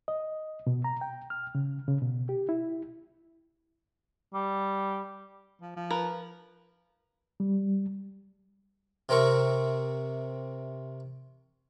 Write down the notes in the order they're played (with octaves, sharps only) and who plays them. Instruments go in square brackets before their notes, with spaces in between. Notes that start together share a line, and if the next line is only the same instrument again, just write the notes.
[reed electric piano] D#5
B2
A#5
G5
F6
C#3
C#3
B2
G4
E4
[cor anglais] G3
[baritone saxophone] F3
F3
[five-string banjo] A#4 B4
[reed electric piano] G3
[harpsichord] C3 C4 A#4 E5 C#6